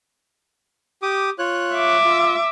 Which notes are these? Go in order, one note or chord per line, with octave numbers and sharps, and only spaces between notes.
G4 D6 D#6
F4 C#5 F#6
E5 D6
F4